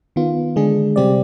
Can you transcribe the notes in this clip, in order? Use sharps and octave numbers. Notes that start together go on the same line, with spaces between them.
D#3 B3 F4
D3 G#3 D4 G#4
C3 G3 C4 G4 D5